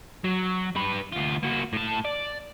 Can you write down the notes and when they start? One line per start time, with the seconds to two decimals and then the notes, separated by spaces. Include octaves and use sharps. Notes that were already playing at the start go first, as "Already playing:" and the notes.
0.24 F#3
0.76 G3 B4
1.12 D2 F4
1.43 A#3 F#4
1.73 A2 A5
2.05 D5